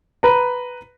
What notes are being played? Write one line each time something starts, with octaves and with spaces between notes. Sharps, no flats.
B4 A#5